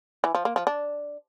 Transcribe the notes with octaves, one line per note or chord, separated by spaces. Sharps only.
E3
F3
A#3
F3
D4